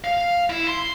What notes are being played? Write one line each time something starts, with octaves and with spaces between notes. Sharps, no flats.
F5
E4
C6